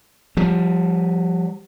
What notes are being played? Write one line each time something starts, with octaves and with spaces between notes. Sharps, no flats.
F3 G3